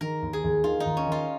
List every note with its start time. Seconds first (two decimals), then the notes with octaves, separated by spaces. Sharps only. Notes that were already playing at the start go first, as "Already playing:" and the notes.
0.01 D#3 A#4
0.22 D#2
0.33 G#4
0.44 D#2
0.64 D#3 F4
0.80 D#4
0.86 D#2
0.97 C#4
1.07 D#3 F4